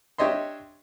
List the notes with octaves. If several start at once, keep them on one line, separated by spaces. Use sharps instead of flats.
D4 G4 C#5 D#5 E5 C6